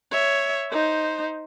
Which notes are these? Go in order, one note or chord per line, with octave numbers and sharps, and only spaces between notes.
C#5 E5
D#4 C5